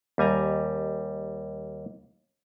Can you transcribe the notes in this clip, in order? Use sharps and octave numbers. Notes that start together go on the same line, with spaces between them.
D#2 G3 G#5 A#5